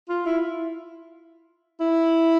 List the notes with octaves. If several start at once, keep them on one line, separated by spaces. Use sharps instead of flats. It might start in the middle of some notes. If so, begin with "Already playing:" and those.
F4
E4
E4